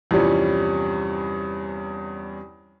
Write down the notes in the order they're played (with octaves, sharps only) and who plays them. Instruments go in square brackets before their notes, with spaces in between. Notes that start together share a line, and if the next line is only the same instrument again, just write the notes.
[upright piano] E2 G2 C3 F3 G3 C#4